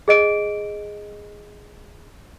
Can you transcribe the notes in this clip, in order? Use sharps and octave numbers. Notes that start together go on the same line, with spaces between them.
G#4 D#5 D7